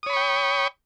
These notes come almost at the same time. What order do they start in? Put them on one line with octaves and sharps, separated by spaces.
D#6 C#5 B5 C#6 G5